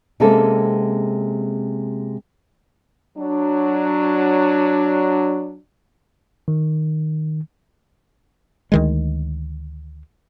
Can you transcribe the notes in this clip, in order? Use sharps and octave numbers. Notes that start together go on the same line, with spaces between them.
C3 G#3 A#3 C4 C#4 A4
F#3 D4
D#3
D2 D#3 G#3